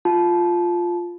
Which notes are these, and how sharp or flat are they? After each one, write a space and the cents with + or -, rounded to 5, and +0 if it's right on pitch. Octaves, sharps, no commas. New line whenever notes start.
F4 +0 A5 -20